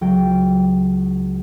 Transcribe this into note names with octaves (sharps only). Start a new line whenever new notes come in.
C#2 F#3 G5